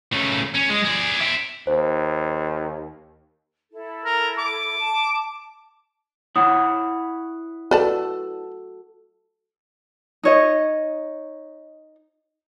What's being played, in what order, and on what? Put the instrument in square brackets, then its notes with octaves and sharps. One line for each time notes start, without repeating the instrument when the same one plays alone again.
[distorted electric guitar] C#3 A3
C#4
G#3
G#4 D5
E5 G5
[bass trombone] D#2 [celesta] C5
[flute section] E4 A4
[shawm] A#4
D6
[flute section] A5
[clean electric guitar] E4 C#5 F#5 [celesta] D#6
[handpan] F#4 A4 [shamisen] B4 D5 A5
[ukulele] D#4 C#5 D#5